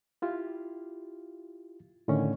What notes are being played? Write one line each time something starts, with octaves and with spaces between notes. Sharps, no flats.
E4 F4 G4
A2 D3 D#3 A3 C#4